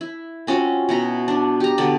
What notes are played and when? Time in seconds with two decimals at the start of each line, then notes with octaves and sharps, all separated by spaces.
0.01 E4
0.47 C4 C#4 F4 F#4
0.89 B2 E4 A#5
1.28 D4
1.60 G4 A#5
1.78 B2 D3 D5